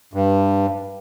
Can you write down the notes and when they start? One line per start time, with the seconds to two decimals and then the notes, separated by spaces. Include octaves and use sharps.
0.14 G2